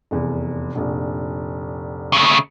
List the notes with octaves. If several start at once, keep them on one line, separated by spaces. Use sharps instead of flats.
F1 E2
F1 A#1
C#3 A3